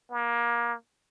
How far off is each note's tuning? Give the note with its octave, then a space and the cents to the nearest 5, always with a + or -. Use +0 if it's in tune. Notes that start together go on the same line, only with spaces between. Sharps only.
A#3 +25